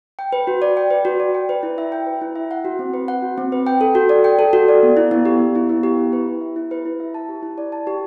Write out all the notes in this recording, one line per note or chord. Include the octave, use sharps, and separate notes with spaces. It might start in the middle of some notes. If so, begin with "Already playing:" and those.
G5
B4
F#4
D5
G5
B4
F#4
D5
G5
B4
E4
E5
G5
B4
E4
E5
F#5
F#4
C4
B4
F#5
F#4
C4
B4
G5
A4
F#4
D5
G5
A4
F#4
D5
B3
E4
B3
G4
B3
E4
B3
G4
E4
B4
E4
E5
E4
B4
E4
E5
A5
G4
E4
D5
A5
G4